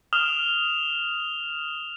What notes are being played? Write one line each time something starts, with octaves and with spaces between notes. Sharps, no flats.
D#6 F6 E7 F7 G7